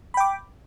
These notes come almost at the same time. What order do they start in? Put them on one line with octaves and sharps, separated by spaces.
B5 G5 D6